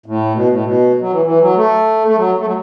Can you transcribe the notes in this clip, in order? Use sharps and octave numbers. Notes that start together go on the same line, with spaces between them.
A2
B2
A2
B2
F#3
E3
E3
F#3
A3
A3
F#3
A3
F#3